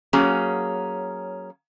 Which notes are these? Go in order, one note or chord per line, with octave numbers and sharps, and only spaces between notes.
F#3 A#3 C#4 F#4 G#4